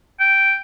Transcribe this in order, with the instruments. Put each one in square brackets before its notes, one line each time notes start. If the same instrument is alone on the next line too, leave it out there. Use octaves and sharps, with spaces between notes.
[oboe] G5